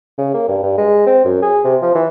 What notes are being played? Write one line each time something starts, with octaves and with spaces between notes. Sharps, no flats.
C#3
A#3
G2
G2
G#3
C4
F#2
G#4
C3
F3
E3